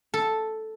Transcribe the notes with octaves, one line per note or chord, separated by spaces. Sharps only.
A4